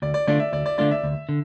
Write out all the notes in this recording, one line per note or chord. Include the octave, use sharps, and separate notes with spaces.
D2 D5
D5
D3 A3 D4 F4 D5
E5
D2 D5
D5
D3 A3 D4 F4 D5
E5
D2
D3